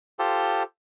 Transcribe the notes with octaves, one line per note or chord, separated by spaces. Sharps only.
F4 G4 A4 C5